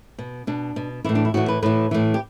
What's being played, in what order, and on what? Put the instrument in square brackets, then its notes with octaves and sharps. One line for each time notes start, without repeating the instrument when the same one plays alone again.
[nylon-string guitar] B2
B2 D4
B2
A2 E3 E4
D4
E4
A2 E3 F#4
B4
A2 E3 B4
A2 E3
G4